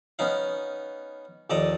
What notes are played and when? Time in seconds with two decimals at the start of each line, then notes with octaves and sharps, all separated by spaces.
0.19 B3 C#4 D#4 F5
1.50 A#1 D#2 A4 D5 D#5 A#5